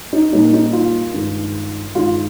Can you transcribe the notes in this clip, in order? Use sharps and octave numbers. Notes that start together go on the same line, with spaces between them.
D#4
A#2 G3 A#3 D#4
D#4
F4
G2 D#3 G#3
G2 D#3 G#3 F4